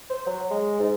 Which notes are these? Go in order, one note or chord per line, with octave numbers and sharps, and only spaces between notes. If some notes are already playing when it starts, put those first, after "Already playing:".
C5
F#3
G#3
G#2